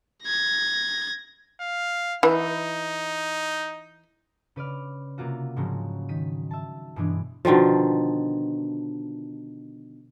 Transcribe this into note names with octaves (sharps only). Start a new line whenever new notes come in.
G#6 A#6
F5
E3 D#4
C#3 B4 D5 F6
C3 A#3 F4 F#4
G#2 C#3 F3 F#3 G#3
D#3 B6 D#7
E5 A5
G2 B2 E3 G#3 B3 D4
B2 D3 D#3 F3